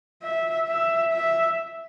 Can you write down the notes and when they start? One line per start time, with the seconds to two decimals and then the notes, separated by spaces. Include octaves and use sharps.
0.23 E5
0.68 E5
1.13 E5